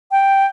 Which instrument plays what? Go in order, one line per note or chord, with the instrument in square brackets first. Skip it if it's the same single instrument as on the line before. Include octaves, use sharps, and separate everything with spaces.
[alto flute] G5